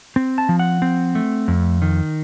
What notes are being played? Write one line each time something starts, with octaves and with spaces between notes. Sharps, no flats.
C4
A5
F3
F#5
C4
A3
F2
D#3